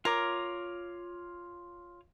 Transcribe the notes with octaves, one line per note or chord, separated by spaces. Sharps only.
F4 A#4 C#5 D6